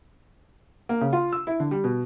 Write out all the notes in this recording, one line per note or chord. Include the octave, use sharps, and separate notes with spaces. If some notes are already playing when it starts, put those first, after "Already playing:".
A#3
C#3
F4
E6
E4
D3
G3
B2